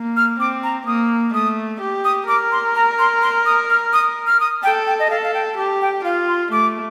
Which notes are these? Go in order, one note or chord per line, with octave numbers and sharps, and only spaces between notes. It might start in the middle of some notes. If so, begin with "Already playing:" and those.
Already playing: A#3
F6
C4 D6
A#5
A#3 D#6
A3 D#6
G4
D#6
A#4 D6
C6
A#5
C6
C6
D#6
F6
D#6
F6
D#6
A4 G5
G5
D#5
A4 F5
F5
G5
G4 A5
G5
F4 F5
C6
A3 D6